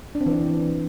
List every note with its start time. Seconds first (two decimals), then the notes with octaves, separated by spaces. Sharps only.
0.15 D4
0.21 C4
0.26 E3